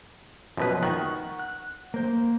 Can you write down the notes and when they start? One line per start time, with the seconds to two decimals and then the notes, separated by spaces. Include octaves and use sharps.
0.57 F#2 B2 F3 B4
0.83 D#3 F#5 C#6
1.39 F#6
1.94 A#3 C5